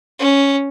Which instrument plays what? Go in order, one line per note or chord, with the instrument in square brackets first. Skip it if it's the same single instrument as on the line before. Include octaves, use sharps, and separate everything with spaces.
[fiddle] C#4